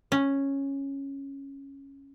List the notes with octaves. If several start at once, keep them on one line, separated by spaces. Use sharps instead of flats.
C#4